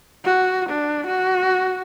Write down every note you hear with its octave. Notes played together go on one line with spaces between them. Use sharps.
F#4
D4
F#4